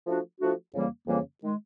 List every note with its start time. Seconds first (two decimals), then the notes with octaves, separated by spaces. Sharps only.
0.07 F3 A3 D4 F#4
0.40 F3 A3 D4 F#4
0.75 F2 C#3 E3 G3 A#3
1.07 F2 C#3 E3 G3 A#3
1.42 D#3 G#3